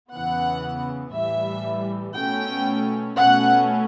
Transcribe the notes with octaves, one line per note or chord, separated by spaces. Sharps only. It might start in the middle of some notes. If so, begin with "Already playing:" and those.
E2 C#3 E3 B3 F#5
A2 E3 G3 E5
B2 A3 C#4 G5
B2 A3 C#4 F#5